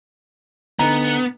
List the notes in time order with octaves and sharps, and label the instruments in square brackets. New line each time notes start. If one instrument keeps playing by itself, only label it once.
[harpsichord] D2 D#4 [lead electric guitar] B3 [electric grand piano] A#5